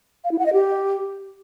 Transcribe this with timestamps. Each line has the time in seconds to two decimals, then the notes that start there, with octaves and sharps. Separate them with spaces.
0.24 F5
0.31 E4
0.39 F#5
0.46 D#5
0.53 G4